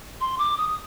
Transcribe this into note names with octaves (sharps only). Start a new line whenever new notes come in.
C6
D6
D#6